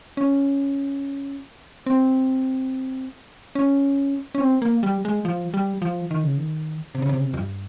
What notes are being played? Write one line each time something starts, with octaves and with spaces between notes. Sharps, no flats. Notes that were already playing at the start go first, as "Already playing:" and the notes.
C#4
C4
C#4
C#4
C4
A#3
G3
G#3
F3
G3
F3
D#3
C#3
D#3
C3
C#3
C3
C#3
C3
F2
G2